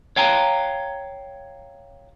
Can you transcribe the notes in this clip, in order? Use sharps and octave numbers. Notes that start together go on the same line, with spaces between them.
C#5 F5 G5 A#5